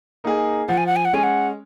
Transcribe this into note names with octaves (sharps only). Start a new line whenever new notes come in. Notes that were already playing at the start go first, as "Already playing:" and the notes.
A#3 D#4 G#4
F3 F#5
G#5
F#5
G#5
F#5
G#3 C#4 G#5
F#5